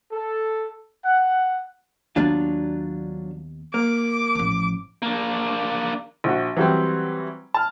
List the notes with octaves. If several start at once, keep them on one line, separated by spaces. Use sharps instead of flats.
A4
F#5
D#2 F#3 B3 D4 F4
A#3 D6
A1 F3
A#3 D4
A#1 F#4
E3 F#3 G3 C4
A5 F6